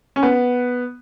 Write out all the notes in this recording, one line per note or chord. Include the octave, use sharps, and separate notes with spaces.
C#4
B3